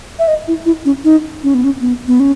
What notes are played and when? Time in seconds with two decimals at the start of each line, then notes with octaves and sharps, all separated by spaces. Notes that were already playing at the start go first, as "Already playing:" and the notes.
0.19 E5
0.28 D#5
0.48 E4
0.66 E4
0.85 C#4
1.04 D#4
1.43 C#4
1.54 B3
1.64 C#4
1.81 B3
2.07 B3
2.20 C#4